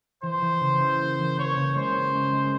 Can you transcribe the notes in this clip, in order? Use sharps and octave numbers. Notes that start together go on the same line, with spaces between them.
E3 C5
E3
C#3
E4
A#3
E3
A#3 C#5
C#3
G#3 C5
C#4
G#3
G#3